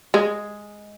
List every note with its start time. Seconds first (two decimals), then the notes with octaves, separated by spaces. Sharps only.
0.14 G#3